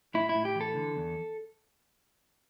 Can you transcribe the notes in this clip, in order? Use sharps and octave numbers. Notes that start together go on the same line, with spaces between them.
A2 E4
E4
A2
G4
E3
A4
D3
E2